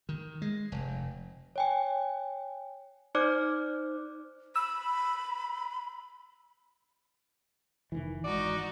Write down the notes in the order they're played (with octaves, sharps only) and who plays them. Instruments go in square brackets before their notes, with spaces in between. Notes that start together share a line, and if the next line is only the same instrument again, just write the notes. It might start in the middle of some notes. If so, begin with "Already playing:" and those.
[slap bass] D#3
G#3
F1
[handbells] C#5 G5 G#5
D#4 C5 D5 D6 F6 F#6
[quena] B5 [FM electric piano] E6
[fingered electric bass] F1 G#2 D#3 [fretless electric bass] E3
[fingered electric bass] G#1 G#2 [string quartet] D#4 F#4 [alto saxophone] D5